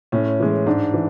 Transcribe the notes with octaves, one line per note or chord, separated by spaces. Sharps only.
A2 C#4
E3 G#3
G#2 D4
E3